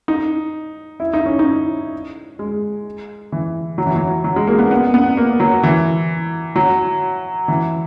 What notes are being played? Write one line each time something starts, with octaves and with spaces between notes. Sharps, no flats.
D#4
E4
D#4
C#4
D#4
G#3
E3
F#3
E3
F#3
F#3
G#3
A#3
B3
B3
B3
A#3
F#3
E3
F#3
E3